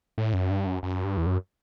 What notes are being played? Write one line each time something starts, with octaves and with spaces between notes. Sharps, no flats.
A2
F#2
G2
F#2
F#2
G2
E2
F#2